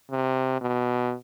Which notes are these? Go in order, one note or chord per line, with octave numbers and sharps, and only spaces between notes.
C3
B2